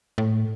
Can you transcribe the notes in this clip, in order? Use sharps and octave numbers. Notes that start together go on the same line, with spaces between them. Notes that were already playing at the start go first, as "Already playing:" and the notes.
A2